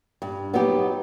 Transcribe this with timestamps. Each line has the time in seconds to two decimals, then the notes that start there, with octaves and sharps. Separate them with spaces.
0.22 G2
0.54 F#3 B3 D#4 G4